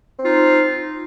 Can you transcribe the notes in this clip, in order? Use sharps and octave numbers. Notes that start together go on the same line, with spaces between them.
C4 D#4 F4